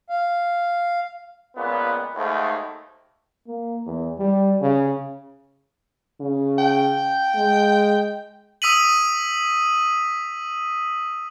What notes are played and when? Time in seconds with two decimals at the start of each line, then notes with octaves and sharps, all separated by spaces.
0.10 F5
1.56 C#2 A#2 B3
2.15 D#2 G#2 A3
3.48 A#3
3.86 E2
4.19 G3
4.61 C#3
6.21 C#3
6.58 G5
7.36 G#3
8.62 D#6 E6 B6 D#7 F#7